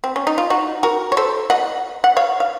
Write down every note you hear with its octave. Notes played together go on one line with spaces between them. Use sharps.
C4
C#4
D#4
F4
D#4 F#4
F#4 A#4
C#5
A4 C5
D#5 F#5
F#5
C#5 F5
F5